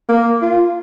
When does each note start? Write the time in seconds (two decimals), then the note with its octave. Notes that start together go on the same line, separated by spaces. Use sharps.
0.09 A#3
0.42 F4